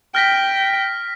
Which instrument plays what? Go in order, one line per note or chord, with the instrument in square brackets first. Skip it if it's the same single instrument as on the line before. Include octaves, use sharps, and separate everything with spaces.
[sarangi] G5 [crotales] F6 A#6 B6